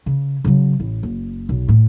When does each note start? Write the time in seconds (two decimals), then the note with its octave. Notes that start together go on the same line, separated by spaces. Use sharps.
0.06 C#3
0.45 C#3 F#3
0.80 A1
1.03 F#1
1.49 B1
1.68 A2